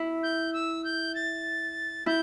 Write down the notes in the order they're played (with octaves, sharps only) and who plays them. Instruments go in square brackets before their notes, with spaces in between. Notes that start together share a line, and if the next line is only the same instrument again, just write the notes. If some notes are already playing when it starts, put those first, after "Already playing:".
Already playing: [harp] E4
[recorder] G6
E6
G6
A6
[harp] E4 [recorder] G6